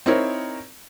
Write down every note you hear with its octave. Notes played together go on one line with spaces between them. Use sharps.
C4 D#4 E4 A#4 C#5